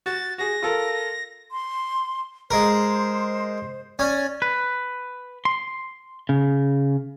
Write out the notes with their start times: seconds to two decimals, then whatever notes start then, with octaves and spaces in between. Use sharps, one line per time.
0.06 F#4 A6
0.38 F#4 G#4 A#6
0.63 F4 A4 A#4
1.51 C6
2.51 G#3 A#4 C5
3.99 C#4 D5 G#5
4.42 B4
5.45 C6
6.29 C#3